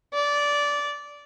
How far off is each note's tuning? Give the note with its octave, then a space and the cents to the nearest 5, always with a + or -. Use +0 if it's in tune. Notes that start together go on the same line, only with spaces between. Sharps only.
D5 -15